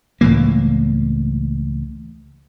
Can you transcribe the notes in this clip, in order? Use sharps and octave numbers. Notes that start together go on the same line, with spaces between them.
C#2 A2 E3 A#3